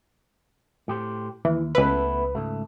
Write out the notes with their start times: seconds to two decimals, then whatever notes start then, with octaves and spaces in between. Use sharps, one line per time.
0.88 A2 G4 C5
1.45 D#2 E3
1.75 C#2 A3 B3 E4 B4
2.35 C#2 G#2 A3